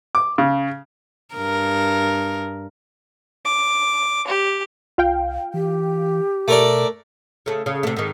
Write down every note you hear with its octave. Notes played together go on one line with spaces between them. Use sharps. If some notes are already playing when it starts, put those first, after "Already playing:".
D6
C#3
G2 A#4
D6
G4
C2 F4 F5 G5
E3 G4
B2 A3 A#4 D5
C#3 A3
C#3
C3 A3
G#2 D#3